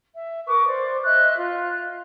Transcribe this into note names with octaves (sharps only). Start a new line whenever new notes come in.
E5
A#4 B4 C#6 D6
C5 D5
D#5 E5 F#6
F4